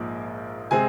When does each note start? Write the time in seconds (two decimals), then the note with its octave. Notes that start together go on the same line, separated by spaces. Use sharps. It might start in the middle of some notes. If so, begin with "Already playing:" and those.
Already playing: A#1 G#2 F3 A#3
0.71 C3 G#3 C4 G#5